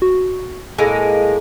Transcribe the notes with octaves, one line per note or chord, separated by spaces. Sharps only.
F#4
A2 G#3 A#3 G#5